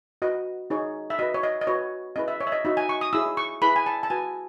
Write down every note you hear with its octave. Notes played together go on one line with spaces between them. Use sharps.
F#4 B4 D#5
D#4 G#4 C#5
E5
F#4 B4 D#5
C#5
D#5
D#5
F#4 B4 C#5
C#4 E4 G#4 B4 D#5
E5
C#5
E5
D#5
D#4 F#4 C#5 E5
G#5
C#6
D#6
E4 G#4 C#5 E6
C#6
E4 G#4 B4 B5
G#5
A5
A5
F#4 B4 G#5